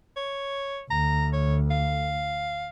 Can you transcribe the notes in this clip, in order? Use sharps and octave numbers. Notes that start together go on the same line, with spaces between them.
C#5
D2 A#5
C#5
F5